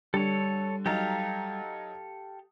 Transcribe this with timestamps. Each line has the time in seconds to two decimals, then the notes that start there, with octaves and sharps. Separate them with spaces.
0.14 D3 G3 A4 C#5
0.86 F#3 D#4 G4 A4 F5 A#5